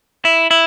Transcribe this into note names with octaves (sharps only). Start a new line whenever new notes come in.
E4
E4